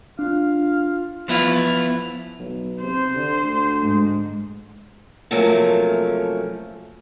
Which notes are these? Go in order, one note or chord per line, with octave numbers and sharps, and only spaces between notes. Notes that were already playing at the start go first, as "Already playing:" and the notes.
D4 F4 F5
F3 B3 E4 F4
B1
C3 C5
D3
D2
G#2
C3 F3 F#3 A3 A#3 C#4